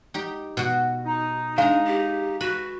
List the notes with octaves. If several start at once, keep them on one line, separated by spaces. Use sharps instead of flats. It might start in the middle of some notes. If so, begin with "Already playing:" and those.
D#4 G4
B2 F#4
D#4
G#3 D4 F5 A#5
G4
F#4 B4 B5